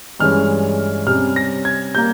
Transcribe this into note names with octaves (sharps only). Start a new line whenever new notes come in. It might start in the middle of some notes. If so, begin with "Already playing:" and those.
G2 E3 G#3 C#4 F6
C3 G3 C#4 F6
A#6
G#6
G3 A#3 G6